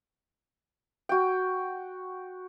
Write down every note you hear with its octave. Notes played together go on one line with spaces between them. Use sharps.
F#4 G5